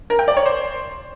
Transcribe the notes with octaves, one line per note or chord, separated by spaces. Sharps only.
A#4
G5
D5
C#5
C5